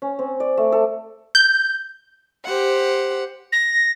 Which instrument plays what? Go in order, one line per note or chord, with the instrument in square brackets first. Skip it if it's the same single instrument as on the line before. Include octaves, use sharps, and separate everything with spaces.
[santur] C#4
C4
D5
A3
A4
[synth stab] G6
[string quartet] G4 C5 F#5
[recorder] A#6